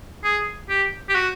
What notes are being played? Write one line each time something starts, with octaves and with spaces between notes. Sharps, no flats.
G#4
G4
G4
F#4